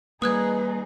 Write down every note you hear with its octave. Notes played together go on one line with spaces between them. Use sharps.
G3 A#3 D#4 G#4 B4 D#6 F#6 G#6